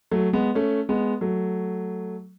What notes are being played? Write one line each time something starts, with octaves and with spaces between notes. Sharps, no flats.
F#3 A3
G#3 B3
A3 C#4
G#3 B3
F#3 A3